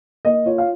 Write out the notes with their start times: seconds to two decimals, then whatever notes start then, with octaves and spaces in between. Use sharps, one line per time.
0.25 A#3 D#5
0.45 F4 C#5
0.58 F5